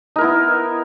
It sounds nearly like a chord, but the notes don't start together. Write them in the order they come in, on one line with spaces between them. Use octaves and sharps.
D#4 A#4 E4 B3